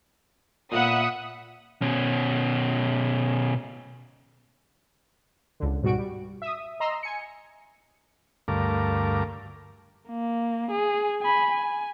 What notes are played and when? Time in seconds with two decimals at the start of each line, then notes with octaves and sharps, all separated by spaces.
0.72 A#2 A#3 B3 E5 F#5 D#6
1.82 B2 C#4
5.60 C#2 D3
5.82 G#2 B2 G3 F#4 D7
5.98 G3
6.42 E5 D#6
6.80 D#5 A#5 C6 E6
7.03 G#5 C#7
8.48 D2 G2 A3 A#4 F5 D6
10.09 A#3
10.71 G#4
11.22 G#5 B5
11.51 G#5